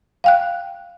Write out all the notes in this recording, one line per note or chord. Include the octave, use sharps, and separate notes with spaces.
F5 G5 F#6